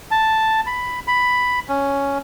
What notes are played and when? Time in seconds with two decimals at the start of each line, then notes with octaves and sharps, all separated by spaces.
0.11 A5
0.67 B5
1.08 B5
1.69 C#4